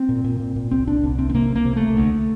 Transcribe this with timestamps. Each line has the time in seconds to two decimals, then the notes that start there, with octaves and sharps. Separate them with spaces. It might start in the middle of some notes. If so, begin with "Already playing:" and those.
Already playing: C4
0.09 A#2
0.24 A#2
0.40 A#2
0.56 A#2
0.71 C2 C4
0.87 C2 D4
1.04 C2
1.19 C3 C4
1.29 C4
1.34 C3 A#3
1.50 C2
1.55 A#3
1.65 C3
1.76 C2 A3
1.97 D2